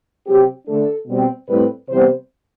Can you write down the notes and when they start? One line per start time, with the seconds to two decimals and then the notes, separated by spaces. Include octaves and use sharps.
0.27 C3 F#3 C4 G4
0.68 D3 A3 D4 A4
1.07 B2 G3 C4
1.48 A2 G3 C4 B4
1.89 C3 E3 G3 B3 C5